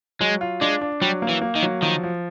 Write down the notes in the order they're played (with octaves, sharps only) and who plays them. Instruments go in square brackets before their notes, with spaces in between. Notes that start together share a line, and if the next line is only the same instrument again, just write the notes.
[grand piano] F#3 [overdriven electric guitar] G#3
[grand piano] F4
[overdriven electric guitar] G#3 [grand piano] D4
[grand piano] D4
[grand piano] F#3 [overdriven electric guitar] G3
[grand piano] A#3
[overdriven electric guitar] E3
[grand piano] A#3
[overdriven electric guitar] D#3
[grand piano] F#3
[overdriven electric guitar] D#3 [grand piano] F3
[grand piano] F3